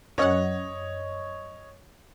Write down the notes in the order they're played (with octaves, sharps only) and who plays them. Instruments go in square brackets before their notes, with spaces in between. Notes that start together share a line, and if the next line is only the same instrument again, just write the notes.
[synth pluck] F#2 C#4 F#5 [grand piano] C#5 D#5